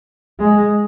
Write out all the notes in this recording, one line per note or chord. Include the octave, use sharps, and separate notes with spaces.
G#3